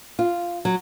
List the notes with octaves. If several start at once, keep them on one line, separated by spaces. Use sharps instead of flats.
F4
F#3